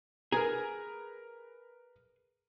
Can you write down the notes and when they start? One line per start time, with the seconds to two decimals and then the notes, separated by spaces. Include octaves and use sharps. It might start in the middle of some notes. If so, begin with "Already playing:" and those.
0.32 G#4 A#4 B4 A#5